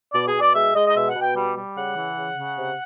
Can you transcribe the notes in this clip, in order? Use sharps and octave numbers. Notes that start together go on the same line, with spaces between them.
B2 D5
G#4
B2
D5
G#3 E5
G#3 D#5
D#5
B2 E5
F#5
B2
G5
G3
G3
C#3 F#5
E3
C#3
C#3
C3